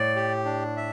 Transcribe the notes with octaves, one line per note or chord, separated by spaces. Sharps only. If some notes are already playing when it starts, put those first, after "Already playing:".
Already playing: A2 D5
G4
D4
E5